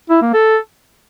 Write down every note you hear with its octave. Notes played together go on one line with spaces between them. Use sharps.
E4
A#3
A4